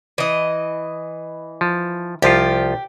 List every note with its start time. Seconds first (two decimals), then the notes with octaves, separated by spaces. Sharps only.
0.18 E3 D#5
1.61 F3
2.22 C2 F3 F4 G4